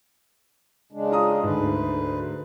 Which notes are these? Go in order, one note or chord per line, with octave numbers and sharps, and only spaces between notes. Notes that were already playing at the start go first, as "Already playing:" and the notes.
C#3 G#3 D4
F4 A#5 D#6
D2 G#2 D3 B4